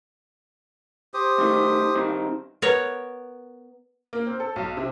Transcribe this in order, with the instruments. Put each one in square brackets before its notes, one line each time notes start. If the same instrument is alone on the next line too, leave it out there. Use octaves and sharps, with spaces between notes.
[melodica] G4 C5 D#6
[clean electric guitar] G2 D#3 A3
G2 D#3 C4
[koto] B3 A#4 C#5
[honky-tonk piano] A#3
C4
A4
B1
C3